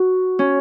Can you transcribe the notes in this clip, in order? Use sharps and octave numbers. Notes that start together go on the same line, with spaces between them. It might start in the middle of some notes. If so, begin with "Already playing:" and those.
Already playing: F#4
C#4